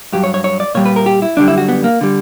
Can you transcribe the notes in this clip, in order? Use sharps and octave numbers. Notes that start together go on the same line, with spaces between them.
G2 F#3 G4
C#5
C#5
C#5
D5
A#2 G3 C#5
B4
A#4
G4
E4
F#2 D3 G3 D4
E4
F#4
B3
A#3
D3 G3